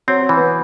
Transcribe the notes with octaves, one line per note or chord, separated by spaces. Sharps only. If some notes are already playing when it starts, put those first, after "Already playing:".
F#3 C4
F#3
E3
B3